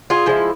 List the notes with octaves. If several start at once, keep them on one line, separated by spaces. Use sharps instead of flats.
F4 G#4
F3 G#3 E4